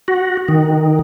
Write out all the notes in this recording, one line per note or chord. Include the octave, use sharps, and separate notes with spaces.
F#4
D#3